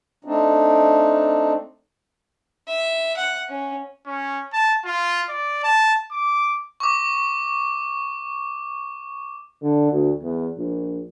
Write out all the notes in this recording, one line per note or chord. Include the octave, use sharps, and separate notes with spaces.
A3 C4 D4 D#4
E5
F#5
C#4
C#4
A5
F4
D5
A5
D6
C#6 D6
D3
D2
E2
A#1